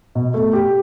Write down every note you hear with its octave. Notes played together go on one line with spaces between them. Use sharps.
B2
A3
G4